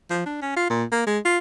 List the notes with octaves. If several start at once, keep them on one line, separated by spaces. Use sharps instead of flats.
F3
D4
C#4
F4
A#2
A#3
G#3
F4